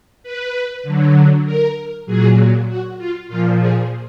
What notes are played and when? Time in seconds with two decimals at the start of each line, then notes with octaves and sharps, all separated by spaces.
0.23 B4
0.83 D3 F#3
1.45 A#4
2.06 A#2 F#3 G#4
2.68 F#4
2.98 F4
3.29 A#2 F3 F4
3.59 G#4